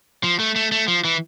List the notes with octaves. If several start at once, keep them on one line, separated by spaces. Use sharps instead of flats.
F3
A3
A3
A3
F3
E3